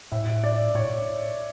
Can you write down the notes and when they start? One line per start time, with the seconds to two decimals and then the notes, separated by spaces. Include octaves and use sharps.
0.12 A2 E5
0.44 D5
0.75 A2 C#5